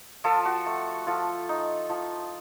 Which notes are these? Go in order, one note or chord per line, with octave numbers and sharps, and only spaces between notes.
F3 F4 A4
F#4
A3
F3 F4 A4
D#4
F3